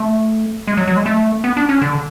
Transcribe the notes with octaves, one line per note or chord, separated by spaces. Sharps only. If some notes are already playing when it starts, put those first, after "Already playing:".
Already playing: A3
G#3
F#3
F#3
G#3
A3
B3
D4
C#4
D3